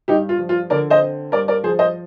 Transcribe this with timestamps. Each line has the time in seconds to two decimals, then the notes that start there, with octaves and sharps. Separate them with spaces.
0.08 G2 D#4 G4
0.29 F4
0.39 F3
0.49 F4
0.70 D3 A#4 D5
0.90 C5 D#5
1.02 C4
1.32 G2 A#4 D5
1.48 A#4 D5
1.63 F3 G#4 C5
1.79 C5 D#5